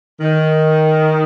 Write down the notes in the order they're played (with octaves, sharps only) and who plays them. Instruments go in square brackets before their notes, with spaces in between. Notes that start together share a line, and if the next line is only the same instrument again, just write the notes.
[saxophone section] D#3